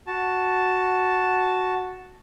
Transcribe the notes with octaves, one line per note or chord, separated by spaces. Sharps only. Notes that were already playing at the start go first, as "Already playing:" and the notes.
F#4 A5